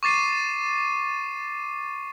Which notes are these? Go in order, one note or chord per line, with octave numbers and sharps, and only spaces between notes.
C#6 D6 A6 C7 D#7